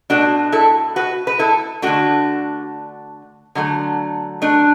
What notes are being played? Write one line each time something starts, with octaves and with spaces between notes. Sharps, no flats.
B2 A3 D4 F#4
E4 A4
F#4 B4
B4
E4 A4
D3 A3 D4 F#4
D3 F#3 A3
A3 D4